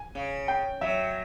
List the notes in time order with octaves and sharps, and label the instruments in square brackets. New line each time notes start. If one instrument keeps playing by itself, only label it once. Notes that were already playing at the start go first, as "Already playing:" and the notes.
Already playing: [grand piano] G#5
[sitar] C#3
[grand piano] G5
[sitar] F#3 [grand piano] E5